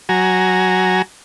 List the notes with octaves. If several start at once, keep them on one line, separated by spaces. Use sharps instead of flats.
F#3 F#4 G#5 A#5